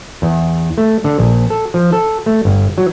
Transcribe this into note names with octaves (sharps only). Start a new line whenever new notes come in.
E2
A3
D3
A#1
A4
F3
A4
A3
G1
F#3